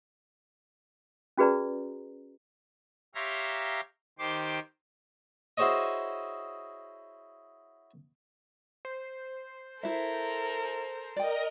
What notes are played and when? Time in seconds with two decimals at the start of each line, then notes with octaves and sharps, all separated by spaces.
1.38 C#4 F#4 G#4 B4 D5 A#5
3.15 G4 C#5 E5 F5 A#5 C6
4.19 D#3 G4 C5 C6 D6
5.57 E4 F#4 G#4 C5 C#5 D#5
8.85 C5
9.83 E4 A4 A#4 E5
11.16 A#4 D5 D#5 G5